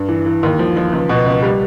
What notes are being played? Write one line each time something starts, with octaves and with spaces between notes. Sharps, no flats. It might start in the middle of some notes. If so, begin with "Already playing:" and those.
Already playing: G2
E3
E3
D#2
F3
F3
C#2
B2
C#2
G3